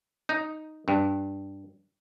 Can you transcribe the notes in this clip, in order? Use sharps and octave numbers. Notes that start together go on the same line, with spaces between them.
D#4
G2